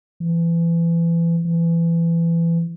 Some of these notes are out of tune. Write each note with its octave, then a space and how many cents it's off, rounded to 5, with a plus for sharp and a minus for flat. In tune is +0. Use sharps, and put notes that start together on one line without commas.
E3 +30
E3 +25